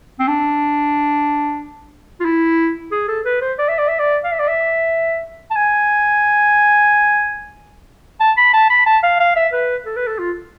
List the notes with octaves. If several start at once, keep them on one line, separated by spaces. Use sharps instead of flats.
C4
D4
F4
E4
G#4
A4
B4
C5
D5
E5
D5
E5
D5
F5
E5
D5
E5
A5
G#5
A5
B5
A5
B5
A5
F5
F5
E5
B4
A4
B4
A4
F4